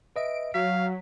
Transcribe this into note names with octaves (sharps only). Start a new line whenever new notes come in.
B4 D#5 E5 D7
F#3 F5 B6